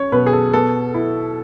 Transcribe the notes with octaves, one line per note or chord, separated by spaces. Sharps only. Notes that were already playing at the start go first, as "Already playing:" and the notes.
Already playing: C#4 C#5
B2 B4
G#4
A4
B3 A4
E4